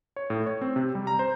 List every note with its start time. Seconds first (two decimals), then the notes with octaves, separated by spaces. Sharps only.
0.16 C#5
0.30 A2
0.46 C#5
0.61 C4
0.76 C3
0.95 G3
1.07 A#5
1.19 C5